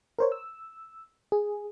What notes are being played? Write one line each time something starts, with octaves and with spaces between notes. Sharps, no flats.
A#4 C5 C#5
E6
G#4